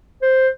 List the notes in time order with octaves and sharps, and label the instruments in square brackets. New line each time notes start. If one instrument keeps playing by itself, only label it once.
[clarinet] C5